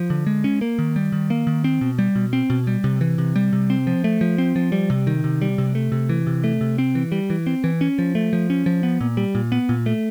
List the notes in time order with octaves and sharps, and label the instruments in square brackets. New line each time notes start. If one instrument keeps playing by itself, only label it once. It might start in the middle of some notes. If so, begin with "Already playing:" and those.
Already playing: [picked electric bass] F3
D3
G#3
C#4
A#3
D#3
G3
D#3
A#3
D#3
C4
B2
G3
B2
C4
B2
G3
C3
E3
C3
G3
C3
C4
F3
A3
F3
C4
F3
G3
C3
D#3
C3
G3
C3
A3
C3
E3
C3
A3
C3
C4
E3
G3
E3
C4
E3
C#4
F3
A3
F3
C#4
F3
B3
A#2
G3
A#2
B3
A#2
A3